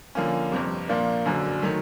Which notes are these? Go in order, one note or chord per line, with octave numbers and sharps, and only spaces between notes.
D3 F3 A#3 C#4
G1 F2 C3
A#2 F3 A#3 D4
F#1 F#2 D3 F#3
D#3 F#3 A3